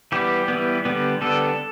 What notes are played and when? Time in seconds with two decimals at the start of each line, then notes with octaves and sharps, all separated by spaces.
0.12 E3 G3 B3 G4
0.48 E3 G3 B3
0.85 D3 G3 B3
1.21 D3 G3 B3 A4